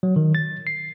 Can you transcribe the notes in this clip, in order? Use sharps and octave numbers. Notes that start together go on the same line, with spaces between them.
F#3
D#3
A6
C7